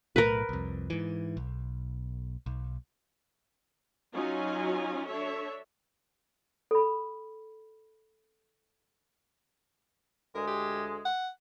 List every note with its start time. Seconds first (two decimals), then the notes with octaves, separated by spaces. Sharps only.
0.16 B1 A2 A3 A#4 B4
0.49 C2 F2
0.90 G#2 E3
1.37 B1
2.46 B1
4.12 F#3 C#4 D#4 F4 G#5
5.06 D4 A4 C#5 E5
6.71 A4 B5
10.35 D2 G#3 A#4
10.47 G4
11.05 F#5